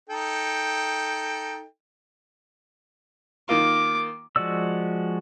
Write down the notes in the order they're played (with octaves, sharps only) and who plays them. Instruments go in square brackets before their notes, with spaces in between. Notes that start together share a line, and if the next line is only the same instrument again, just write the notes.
[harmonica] D#4 A4 G5
[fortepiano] D#3 A#3 F4 [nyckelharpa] D6
[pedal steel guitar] F3 G#3 F#4 D5 E6